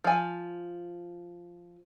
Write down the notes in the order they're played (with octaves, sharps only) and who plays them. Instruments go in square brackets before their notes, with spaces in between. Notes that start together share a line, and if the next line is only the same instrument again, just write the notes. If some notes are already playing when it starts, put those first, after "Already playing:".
[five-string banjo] F3 G#5